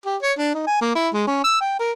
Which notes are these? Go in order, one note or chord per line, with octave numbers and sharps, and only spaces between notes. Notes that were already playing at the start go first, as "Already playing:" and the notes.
G4
C#5
D4
D#4
G#5
A#3
E4
G#3
C#4
E6
G5
A#4